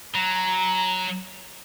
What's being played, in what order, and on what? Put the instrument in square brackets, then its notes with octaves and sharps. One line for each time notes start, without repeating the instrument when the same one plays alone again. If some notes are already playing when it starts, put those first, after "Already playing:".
[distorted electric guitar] F#3 [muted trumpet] A#5